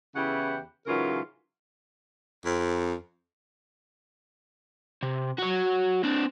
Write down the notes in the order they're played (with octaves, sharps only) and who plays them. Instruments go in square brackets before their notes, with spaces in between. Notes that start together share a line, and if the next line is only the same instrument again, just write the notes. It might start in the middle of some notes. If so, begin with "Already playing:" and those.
[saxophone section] E2 C#3 E3 E4 G4 F#5
G#2 C#3 E3 F#3 F4 A#4
[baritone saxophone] F2
[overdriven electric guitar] C3
F#4 C#5
C4 D4